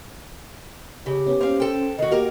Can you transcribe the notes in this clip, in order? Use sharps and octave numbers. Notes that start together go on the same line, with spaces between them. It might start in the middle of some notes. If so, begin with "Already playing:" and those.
C#3 G4
B3 C#4
A#3 C#4 C5 F5
A4 G5
D#3 F#4 D#5
A#3 F#4 G4 A#4